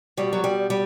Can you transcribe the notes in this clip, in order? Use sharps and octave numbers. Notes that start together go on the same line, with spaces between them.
B2 G3
F#3
G3
G3